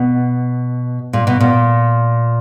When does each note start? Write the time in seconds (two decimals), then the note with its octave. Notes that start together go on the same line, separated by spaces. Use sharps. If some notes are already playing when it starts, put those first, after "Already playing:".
Already playing: B2
1.13 A#2
1.27 B2
1.40 A#2